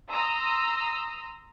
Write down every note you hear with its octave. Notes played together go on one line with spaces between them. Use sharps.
A#5 C6 D#6 E6